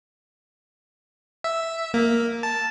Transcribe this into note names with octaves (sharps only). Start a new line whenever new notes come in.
E5
A#3
A5